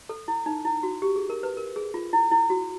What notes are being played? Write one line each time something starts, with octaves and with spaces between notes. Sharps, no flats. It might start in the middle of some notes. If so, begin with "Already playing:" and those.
A4
E4
D#4
E4
F#4
G4
G#4
A#4
B4
A#4
G#4
F4
E4
E4
F#4